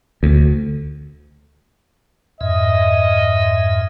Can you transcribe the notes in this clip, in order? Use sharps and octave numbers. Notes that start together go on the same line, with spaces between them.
D2
F2 G#2 D#5 E5